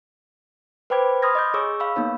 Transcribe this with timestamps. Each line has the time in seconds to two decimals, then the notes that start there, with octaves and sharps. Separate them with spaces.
0.90 B4 C5 G5 B5 D6 G#6
1.22 B5 C6 D#6 F6 G#6 A#6
1.35 D#5 D6 G6
1.54 G#4 C#5 C#6 D6 E6
1.80 F5 B5 E6
1.96 A#3 B3 D#4 C#5